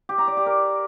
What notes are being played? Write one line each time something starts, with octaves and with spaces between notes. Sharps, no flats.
G4
A#5
D5
G4
A#4